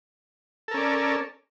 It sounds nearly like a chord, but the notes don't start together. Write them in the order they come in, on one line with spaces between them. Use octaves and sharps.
A4 A#4 C#4 D5